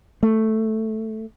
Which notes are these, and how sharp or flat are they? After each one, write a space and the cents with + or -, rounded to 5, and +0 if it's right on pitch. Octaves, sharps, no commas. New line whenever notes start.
A3 +0